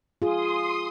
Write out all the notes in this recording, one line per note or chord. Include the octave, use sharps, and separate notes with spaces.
F4 G#4 C6 D#6